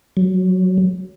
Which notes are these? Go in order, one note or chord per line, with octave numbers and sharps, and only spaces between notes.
F#3